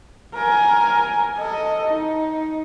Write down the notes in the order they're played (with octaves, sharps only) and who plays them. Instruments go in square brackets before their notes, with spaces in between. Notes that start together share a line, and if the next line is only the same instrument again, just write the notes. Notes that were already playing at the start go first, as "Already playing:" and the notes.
[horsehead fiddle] A#4 G#5
A4 D#5
D#4